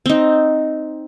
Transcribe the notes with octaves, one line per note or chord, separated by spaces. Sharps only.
C4 D#4